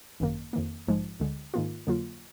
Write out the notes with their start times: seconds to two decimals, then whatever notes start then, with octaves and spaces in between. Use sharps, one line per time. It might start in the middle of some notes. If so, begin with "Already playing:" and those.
0.20 G#1 F#2 D#3 A#3
0.53 F2 D#3 A#3
0.87 A#1 G#2 F3 G#3
1.20 D2 D3 G#3
1.54 G#2 D#3 A#3 F4
1.87 F2 D3 F#3 A#3 F4